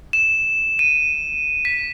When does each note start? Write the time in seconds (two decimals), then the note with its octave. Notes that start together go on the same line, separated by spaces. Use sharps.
0.13 E7
0.79 D#7
1.65 B6